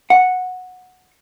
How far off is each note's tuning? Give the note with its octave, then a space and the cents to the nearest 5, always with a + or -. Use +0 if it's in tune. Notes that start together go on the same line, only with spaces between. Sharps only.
F#5 -10